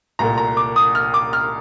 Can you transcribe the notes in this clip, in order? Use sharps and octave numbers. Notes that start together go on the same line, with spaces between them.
C2 A#2 A3 A#5
A#5
D6
D#6
F6
D6
F6